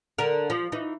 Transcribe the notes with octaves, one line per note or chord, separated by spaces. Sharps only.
D3 A#4
F3
E3 D#4